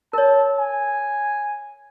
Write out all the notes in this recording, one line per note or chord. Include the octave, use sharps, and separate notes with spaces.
A#4 C#5 A5
G#5